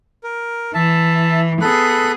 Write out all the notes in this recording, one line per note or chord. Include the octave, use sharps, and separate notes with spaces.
A#4
E3 E5 A5
B3 G#4 A4 B5 F#6